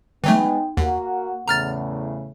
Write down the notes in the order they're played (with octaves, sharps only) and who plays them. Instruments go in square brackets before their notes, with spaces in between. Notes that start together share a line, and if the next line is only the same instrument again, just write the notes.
[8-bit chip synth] E3 F#3 A3 [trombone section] G#3 B3 [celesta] D#4 G5
[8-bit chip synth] D#2 [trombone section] A#3 F#4 [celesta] F#5
[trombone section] E2 A2 C#3 [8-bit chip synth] A#5 F6 A6